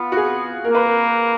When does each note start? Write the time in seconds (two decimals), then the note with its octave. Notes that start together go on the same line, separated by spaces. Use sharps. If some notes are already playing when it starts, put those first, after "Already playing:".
Already playing: B3 F4
0.12 F#4
0.17 G#4
0.65 A#3 A#4
0.75 B4
0.86 A#4